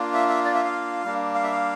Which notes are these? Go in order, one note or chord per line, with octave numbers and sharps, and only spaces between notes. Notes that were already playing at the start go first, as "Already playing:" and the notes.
Already playing: A#3 D4 F4
E5
E5
D5
E5
F5
G3 A#3 D4
F5
E5
F5